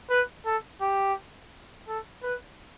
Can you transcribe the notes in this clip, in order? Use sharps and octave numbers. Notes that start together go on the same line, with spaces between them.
B4
A4
G4
A4
B4